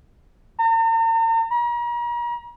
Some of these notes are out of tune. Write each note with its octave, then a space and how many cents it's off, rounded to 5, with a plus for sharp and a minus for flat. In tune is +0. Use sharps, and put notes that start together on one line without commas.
A#5 -45
A#5 +40